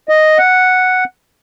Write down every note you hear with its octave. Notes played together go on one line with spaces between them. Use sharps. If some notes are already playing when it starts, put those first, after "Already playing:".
D#5
F#5